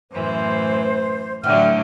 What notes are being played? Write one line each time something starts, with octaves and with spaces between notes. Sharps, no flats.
F#2 A2 E3 B4 C5
A2 D3 E3 F#3 F#5 G5 F6